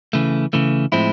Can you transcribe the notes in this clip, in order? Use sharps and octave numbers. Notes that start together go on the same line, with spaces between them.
C#3 E3 A3
C#3 E3 A3
A2 F3 G#3 C4 E4